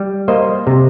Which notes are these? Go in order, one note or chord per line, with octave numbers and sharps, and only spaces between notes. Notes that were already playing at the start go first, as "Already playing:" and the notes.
Already playing: G3
A#3 C5 D#5
C3